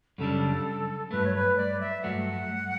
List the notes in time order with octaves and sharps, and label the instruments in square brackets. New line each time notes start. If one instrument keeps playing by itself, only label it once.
[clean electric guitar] F#2 C#3 G3 D4 [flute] A4
[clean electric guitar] G2 F#3 A3 [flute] B4
[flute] C#5
B4
D5
E5
[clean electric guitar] G2 F#3 A3 [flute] F#5